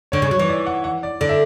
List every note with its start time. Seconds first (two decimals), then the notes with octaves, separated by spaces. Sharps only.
0.12 D3 C#5
0.22 C#3
0.31 F#3
0.39 E3 C#5
0.49 D5
0.66 F#5
0.84 F#5
1.03 D5
1.21 D3 D5
1.29 E5